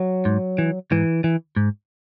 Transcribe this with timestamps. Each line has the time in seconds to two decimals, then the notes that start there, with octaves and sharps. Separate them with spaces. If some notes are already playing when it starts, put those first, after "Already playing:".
Already playing: F#3
0.25 G#2
0.58 E3
0.91 G#2 E3
1.24 E3
1.56 G#2